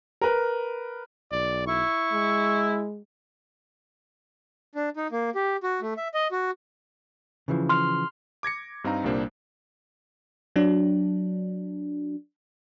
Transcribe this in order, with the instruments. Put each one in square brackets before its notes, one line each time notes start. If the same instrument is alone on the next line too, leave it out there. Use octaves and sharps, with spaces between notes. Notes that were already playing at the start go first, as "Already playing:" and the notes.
[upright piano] A#4 B4
[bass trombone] B1 [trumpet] D5
[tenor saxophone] E4 [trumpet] C#6
[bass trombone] G#3
[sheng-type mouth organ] D4
D#4
A#3
G4
F#4
A3
E5
D#5
F#4
[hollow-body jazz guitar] C#3 E3 F3
[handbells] C6 F6
[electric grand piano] D6 G#6 A#6 C#7
G2 C4 D#4 F5 A#5
C2 A#2 G3 A#3 D4 C5
[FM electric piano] F#3 D4